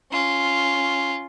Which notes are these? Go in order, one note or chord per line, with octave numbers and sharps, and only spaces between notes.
C#4 F4